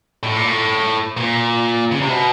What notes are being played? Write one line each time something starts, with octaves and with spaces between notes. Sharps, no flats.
A2
A#2
A2
A#2
C#3
C3
B2